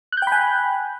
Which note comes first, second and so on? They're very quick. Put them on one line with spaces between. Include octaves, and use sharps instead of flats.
F#6 G6 G5 B5 G#5